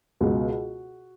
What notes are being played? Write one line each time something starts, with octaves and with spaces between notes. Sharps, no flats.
C#2 B2 F#4